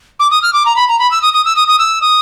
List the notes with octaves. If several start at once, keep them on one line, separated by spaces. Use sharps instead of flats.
D6
D#6
F6
D6
A#5
B5
A#5
B5
E6
D#6
D#6
E6
D#6
D#6
E6
D#6